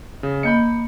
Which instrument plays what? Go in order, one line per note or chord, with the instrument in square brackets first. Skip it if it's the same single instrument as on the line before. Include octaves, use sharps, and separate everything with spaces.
[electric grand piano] C#3
[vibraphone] A#3 D#5 [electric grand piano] B5 G6 C#7